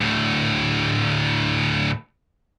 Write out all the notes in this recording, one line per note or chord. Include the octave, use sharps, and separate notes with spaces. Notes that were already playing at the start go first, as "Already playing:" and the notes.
D2 A2